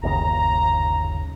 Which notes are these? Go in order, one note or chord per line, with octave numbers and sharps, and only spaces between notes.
G1 D#2 C#3 A#5